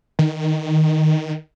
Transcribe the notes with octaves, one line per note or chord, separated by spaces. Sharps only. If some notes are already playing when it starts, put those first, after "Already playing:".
D#3